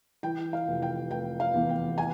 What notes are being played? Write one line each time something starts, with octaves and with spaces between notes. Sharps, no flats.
E3 G5
F5
F1
G5
F1 G5
F5
E2
G5
G#5